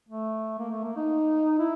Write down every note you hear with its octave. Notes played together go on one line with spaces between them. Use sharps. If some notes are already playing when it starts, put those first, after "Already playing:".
A3
A#3
A3
A#3
D#4
E4